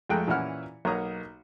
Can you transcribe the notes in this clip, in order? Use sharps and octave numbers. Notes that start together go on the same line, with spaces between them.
F2 G#3 A3 G5 A#5 F#6
A#2 E3 C#4 E4 F#5 F6
B1 A#3 C#5 F#5 A#5 D#6